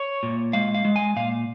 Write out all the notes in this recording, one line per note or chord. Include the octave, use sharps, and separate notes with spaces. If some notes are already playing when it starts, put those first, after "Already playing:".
Already playing: C#5
A#2
G#3 F5
F5
G#3
G#5
A#2 F5